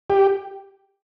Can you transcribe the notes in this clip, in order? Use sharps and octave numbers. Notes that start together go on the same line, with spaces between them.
G4